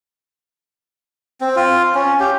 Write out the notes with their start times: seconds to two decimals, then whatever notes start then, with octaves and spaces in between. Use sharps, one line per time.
1.41 C4
1.56 F4
1.95 C#4
2.20 G4